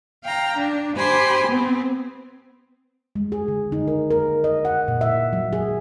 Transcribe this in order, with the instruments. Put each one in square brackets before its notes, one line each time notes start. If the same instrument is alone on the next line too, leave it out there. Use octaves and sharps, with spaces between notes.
[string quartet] F5 G5 A#5
D4
G4 C5 G#5 B5 C6
B3 C4
[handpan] G#3
G#4
D3
D#4
A#4
A#4
D#5
F#5
A#2
E5
F#3
G#4